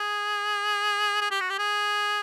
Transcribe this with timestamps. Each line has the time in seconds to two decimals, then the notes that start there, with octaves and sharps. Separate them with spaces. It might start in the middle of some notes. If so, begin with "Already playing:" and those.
Already playing: G#4
1.21 G#4
1.31 G4
1.41 F#4
1.50 G4
1.59 G#4